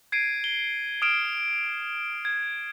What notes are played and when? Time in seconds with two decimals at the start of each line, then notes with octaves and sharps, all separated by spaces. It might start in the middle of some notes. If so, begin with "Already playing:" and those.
0.12 G#6 C7 D7 D#7
0.44 G7
1.02 D#6 F6 D7 E7
2.25 G#6